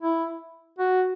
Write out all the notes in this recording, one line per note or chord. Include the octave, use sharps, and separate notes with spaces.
E4
F#4